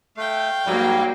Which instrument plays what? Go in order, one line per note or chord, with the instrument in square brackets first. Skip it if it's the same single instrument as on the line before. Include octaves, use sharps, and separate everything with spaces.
[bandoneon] A3 [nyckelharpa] F5 G5
[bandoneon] G#2 G3 [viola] F#3 A#3